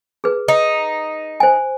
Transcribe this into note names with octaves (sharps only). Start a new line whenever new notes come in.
G#4 B4
D#4
C5 G#5